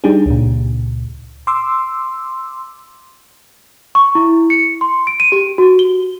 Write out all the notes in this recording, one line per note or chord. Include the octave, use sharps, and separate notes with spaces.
G3 D4 D#4 G4 G#4
C#2 A#2
C6 D6 E6
C#6
E4
C#7
C6
D7
D#7
G4
F#4
G7